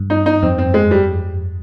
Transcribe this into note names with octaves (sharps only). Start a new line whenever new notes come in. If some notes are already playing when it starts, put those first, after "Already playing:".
Already playing: G2
D#4
D#4
F2 C4
C4
G#3
G3